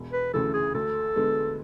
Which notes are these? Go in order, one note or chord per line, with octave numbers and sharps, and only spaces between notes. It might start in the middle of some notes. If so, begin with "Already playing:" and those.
Already playing: E1
B4
D2 C#3 E3 A4
G#4
D2 A4
D3 G#3 B3